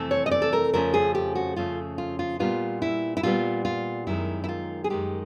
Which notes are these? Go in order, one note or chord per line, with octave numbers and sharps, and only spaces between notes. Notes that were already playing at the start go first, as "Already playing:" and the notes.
Already playing: F2 C3 E3 A3 C4
C#5
D#5
D5
A4
A#4
F2 C#3 F3 A3 C#4 A#4
G#4
G4
F#4
F2 C#3 F3 A3 C#4 F4
F4
F4
A#2 G3 B3 F4
E4
E4
A#2 G3 B3 F4
F4
F#2 D#3 G#3 E4
E4
F4
G#4
F#2 D#3 G#3 G4